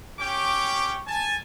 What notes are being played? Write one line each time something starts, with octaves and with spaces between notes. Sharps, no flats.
C#4 G4 C#5 G5 D6
G#5 A5